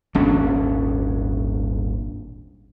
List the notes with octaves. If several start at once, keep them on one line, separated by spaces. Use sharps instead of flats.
D#1 G#1 C#4 D4